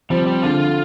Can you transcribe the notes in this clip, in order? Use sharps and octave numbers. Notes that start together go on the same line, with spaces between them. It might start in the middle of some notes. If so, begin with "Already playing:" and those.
F3 G3 C4
G3
D3 F4